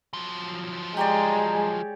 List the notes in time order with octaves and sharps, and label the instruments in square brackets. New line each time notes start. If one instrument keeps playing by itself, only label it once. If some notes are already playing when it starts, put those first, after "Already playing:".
[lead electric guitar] F3 F#3
[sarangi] G#3 [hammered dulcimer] G4 C#5 D5 [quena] A#5